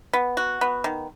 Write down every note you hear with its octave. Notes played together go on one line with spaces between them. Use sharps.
B3
F#4
B3
D#3